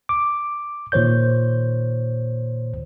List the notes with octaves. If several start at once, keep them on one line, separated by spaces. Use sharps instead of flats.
D6
A#2 D#3 C5 C#5 G6